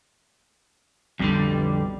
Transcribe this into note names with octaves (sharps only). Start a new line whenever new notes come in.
B1 F2 D3 G3